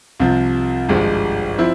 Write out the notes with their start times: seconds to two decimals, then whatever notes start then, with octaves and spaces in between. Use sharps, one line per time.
0.20 C2 C3 F3
0.89 G#1 G2 F3 G#3
1.58 F3 C4 E4